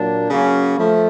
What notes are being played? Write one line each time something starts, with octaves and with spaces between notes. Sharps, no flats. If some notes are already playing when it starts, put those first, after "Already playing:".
Already playing: A#2 F#3 A#3 D4
C#3 F#3 A#3 C#4
F3 A3